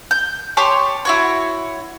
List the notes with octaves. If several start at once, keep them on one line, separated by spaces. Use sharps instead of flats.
G6
G4 C#5 A5 C6
E4 F#4 C#5